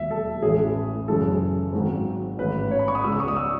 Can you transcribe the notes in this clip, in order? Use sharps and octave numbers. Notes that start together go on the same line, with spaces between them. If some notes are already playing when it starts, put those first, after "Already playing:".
Already playing: E1 D#2 D#3 F#3 E5
A4
A1 A2 E3 G#3 G#4
F#1 F#2 C#3 E3 G#3 A4
G#1 G#2 D#3 F#3
A1 G#2 D#3 B4
C#5
B5
C#6
D#6
C#2 C#3 G#3 E6
D#6
C#6
D#6
E6